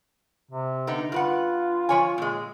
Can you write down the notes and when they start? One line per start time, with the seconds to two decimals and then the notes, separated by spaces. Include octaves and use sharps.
0.51 C3
0.87 D3 B3 D#4
1.12 G2 F4 B4 F#5
1.89 F3 C#5 G#5
2.18 A#2 G#3